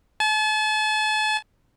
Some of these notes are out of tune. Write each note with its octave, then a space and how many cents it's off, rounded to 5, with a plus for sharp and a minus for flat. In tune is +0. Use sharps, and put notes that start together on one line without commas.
A5 -40